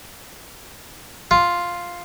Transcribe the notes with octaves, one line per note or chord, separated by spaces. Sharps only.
F4